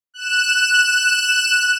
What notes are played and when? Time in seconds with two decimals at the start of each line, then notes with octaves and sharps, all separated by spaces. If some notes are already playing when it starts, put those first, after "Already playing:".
0.14 F#6 E7